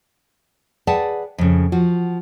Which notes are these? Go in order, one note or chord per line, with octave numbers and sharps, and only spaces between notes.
G#4 B4 D5 F#5 G5 A5
F2 C#3
F3 F#4